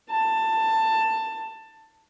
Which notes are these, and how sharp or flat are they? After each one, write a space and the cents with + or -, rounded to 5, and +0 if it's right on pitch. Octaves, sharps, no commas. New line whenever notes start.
A5 +15